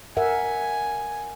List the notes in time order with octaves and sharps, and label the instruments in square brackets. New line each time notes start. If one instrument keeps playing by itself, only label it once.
[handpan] A#4 E5 F#5 [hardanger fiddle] G#5